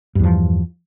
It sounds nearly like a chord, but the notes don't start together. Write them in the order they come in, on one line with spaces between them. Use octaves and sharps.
G2 E2 F3